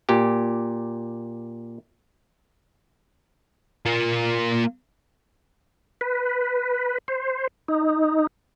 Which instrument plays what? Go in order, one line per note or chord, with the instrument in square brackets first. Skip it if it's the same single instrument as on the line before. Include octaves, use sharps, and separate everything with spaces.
[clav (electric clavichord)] A#2 G4
[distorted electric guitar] A#3 F4
[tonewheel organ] B4
C5
D#4